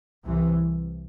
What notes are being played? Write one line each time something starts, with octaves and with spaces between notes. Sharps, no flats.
C2 C3 E3